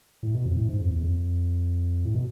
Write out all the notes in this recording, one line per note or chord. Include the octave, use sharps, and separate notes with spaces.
A2
B2
F2
A2
G#2
F2
E2
F2
A2
B2